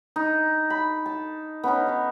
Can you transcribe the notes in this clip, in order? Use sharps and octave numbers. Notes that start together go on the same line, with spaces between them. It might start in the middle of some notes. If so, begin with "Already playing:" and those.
D#4
B5
A5
B3 C#4 D#4
C#5 A5